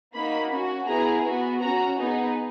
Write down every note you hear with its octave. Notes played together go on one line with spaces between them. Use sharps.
A#3 D#4 F#4 B5
C#4 F#4
B3 E4 G#4 A#5
B3 F#4
C#4 F#4 A#5
B3 D#4 G#4